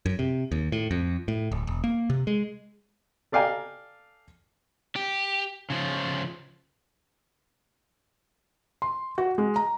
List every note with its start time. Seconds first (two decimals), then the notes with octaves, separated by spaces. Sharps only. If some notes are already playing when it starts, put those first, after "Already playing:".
0.06 F#2
0.19 C3
0.52 D#2
0.72 A2
0.91 F2
1.28 A2
1.51 D1
1.67 E1
1.84 A#3
2.10 C3
2.27 G#3
3.32 A4 D5 F5 G5 G#5 A#5
4.96 G4
5.70 C#3 F3
8.82 C6
9.18 F#4
9.38 G#3
9.56 A#5